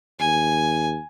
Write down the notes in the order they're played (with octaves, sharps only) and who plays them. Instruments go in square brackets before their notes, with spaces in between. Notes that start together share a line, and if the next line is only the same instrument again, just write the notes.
[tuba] D#2 [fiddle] G#5